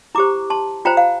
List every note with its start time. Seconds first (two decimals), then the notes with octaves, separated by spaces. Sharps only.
0.15 E4 G4 C5 A#5 D6
0.50 A5 C6
0.85 F4 C5 G5 A#5
0.97 F5